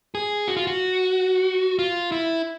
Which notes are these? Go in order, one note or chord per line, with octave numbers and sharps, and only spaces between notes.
G#4
F#4
F4
F#4
F4
E4